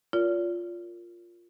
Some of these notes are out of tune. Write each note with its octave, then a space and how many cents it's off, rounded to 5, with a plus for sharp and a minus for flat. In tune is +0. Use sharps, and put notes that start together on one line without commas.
F4 +0 A#4 -5 D5 -40